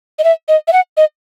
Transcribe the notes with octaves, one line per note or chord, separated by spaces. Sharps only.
D#5
E5
D#5
E5
F#5
D#5